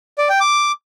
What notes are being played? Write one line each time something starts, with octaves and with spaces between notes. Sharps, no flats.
D5
G5
D6